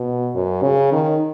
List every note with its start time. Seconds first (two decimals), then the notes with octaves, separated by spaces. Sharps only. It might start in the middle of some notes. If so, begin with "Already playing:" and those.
Already playing: B2
0.35 F#2
0.63 C#3
0.92 D#3